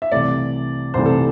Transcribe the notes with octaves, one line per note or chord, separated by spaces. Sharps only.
E5
C2 C3 E3 A3 D5
C2 C3 E3 A3 C5
A4